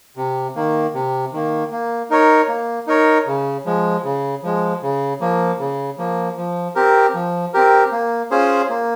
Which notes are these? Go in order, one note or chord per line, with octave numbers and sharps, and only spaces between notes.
C3
D#3 A#3
C3
D#3 A#3
A#3
D#4 A#4 C#5
A#3
D#4 A#4 C#5
C#3
F3 G#3
C#3
F3 G#3
C#3
F3 A#3
C#3
F3 A#3
F3
C4 G4 A#4
F3
C4 G4 A#4
A#3
C#4 F4 G#4 C5
A#3